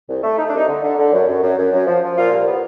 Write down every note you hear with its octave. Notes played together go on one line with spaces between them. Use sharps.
C2
A3
A3 D#4
D4
C2 D#4
D3
D3
D3
F#2
F#2
F#2
F#2
F#2
F3
F3
A#2 F4
C2
B3